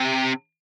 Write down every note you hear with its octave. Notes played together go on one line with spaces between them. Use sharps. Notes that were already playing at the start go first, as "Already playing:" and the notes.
Already playing: C3